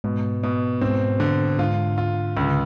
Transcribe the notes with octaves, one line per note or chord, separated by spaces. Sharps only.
G#2 B2
B2
G#2 C4
D3
G#2 F4
F4
C#2 D3
C#3